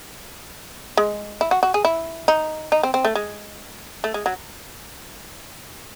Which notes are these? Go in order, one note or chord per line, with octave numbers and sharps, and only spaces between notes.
G#3
E4
F#4
F#4
G#4
E4
D#4
D#4
C4
C4
A3
G#3
A3
G#3
F#3